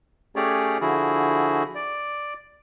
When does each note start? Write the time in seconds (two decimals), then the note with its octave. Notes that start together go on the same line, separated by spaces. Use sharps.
0.36 A3 C#4 G4 G#4 C#5 D5
0.81 D3 F3 E4 F#4 G#4
1.75 D5